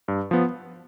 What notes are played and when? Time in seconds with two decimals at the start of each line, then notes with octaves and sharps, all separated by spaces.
0.08 G2
0.31 F3 B3